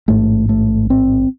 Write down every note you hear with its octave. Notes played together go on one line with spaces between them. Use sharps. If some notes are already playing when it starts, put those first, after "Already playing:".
A1 G#2 A3
A3
C4